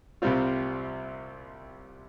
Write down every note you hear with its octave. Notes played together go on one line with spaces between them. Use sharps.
C2 C3 G3 C4 F4